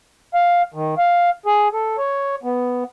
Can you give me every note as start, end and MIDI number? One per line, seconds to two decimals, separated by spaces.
0.34 0.62 77
0.74 0.95 51
0.98 1.30 77
1.46 1.68 68
1.73 1.97 69
1.98 2.36 73
2.43 2.84 59